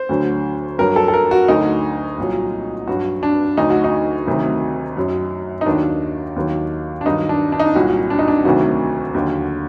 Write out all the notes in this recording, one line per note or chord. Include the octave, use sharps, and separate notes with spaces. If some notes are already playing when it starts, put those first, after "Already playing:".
Already playing: C5
D2 D3 F#3
G2 F#3 A#4
A4
A4
A#4
F#4
D2 D3 F#3 D#4
C2 A#2 F#3
G2 F#3 F#4
D4
D2 D3 F#3 D#4
F#4
D#4
D2 C3 D#3 F#3
F#2 F#3
D#4
D#2 D#3 F#3 D4
D#2 D#3 F#3
D4
G2 D#3 F#3 D#4
D4
D4
D#4
D4
C2 A#2 F#3 F#4
D4
D#4
D4
D2 C3 D#3 F#3 F#4
D#2 D3 F#3